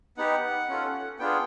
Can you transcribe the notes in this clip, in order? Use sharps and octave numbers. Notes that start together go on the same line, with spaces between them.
B3 D#4 G4 F#5
C#4 F4 A4
B3 D4 F4 G#4 G5